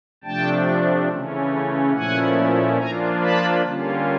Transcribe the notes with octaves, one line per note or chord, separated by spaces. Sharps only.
C3 F3 A3 D4 G5 A5
C#3 E3 A3 C#4
A#2 F3 A3 C#4 E4 F#5 G#5
F3 A#3 D4 F4 G#5 A#5
A5 B5
D3 G3 A#3 C#4 F4